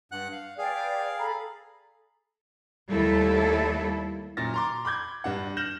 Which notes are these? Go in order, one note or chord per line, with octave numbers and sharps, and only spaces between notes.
G2 F#5 F#6
F5
G#4 B4 D5 F5 G5
A4 A#5 B5
D#2 G3 A3 A#3 E4 A4
F#2 A#2 A6 A#6
A#5 C6 D6
B5 D6 G6 G#6
G2 D4 F#5
F6 G6 A#6 E7 F#7